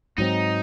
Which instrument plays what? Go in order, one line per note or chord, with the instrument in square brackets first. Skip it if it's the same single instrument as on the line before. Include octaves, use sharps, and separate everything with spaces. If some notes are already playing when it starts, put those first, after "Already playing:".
[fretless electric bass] G#2 F#3 C4 [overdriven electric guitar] D#4